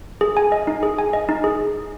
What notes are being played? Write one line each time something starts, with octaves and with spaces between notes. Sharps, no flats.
G#4
G#5
D#5
D#4
G#4
G#5
D#5
D#4
G#4